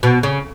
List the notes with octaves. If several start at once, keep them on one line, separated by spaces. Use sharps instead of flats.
B2
C#3